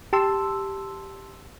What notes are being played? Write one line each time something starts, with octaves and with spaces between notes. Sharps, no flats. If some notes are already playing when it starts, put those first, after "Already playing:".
G4 A5 C6 E6